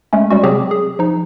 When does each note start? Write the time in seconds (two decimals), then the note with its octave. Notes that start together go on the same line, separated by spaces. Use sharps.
0.13 G#3 A3 C#4
0.30 G3 G#3 C#4 F#4
0.43 C3 F#3 C4 G4 G#4
0.71 G#4
0.99 F3 D#4